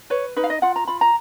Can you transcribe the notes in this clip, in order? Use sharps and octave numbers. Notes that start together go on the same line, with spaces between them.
B4 C#5
D#4 B4
F5
D#5
F4 F#5
A#5
F4 B5
A#5